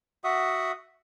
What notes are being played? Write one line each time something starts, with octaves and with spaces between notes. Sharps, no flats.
F#4 E5 F#5 D#6